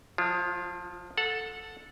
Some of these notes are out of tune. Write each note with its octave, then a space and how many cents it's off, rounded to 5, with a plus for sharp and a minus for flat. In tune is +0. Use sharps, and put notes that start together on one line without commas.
F3 +25 F4 -25
A4 +0 F#5 -25